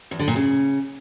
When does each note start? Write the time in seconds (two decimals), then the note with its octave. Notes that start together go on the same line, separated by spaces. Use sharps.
0.11 E2
0.19 D3
0.28 A#2
0.36 C#3